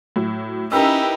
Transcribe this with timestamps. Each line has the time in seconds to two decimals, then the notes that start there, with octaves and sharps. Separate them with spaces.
0.16 A2 F#3
0.72 C#4 D#4 E4 G4 A#4 B4 E6